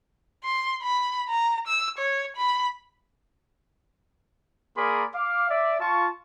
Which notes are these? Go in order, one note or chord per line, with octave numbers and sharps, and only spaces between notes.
C6
B5
A#5
E6
C#5
B5
A#3 G#4 A#4 D5 B5 C6
F5 D6
D5 E5
F4 A5 C#6